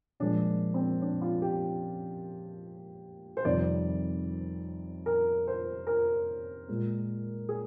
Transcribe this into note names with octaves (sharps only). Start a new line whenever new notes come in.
A#2 F3 G#3 D4
C4
D4
F4
G4
C5
F2 C3 D#3 G3 D5
A#4
C5
A#4
A#2 G#3
G#4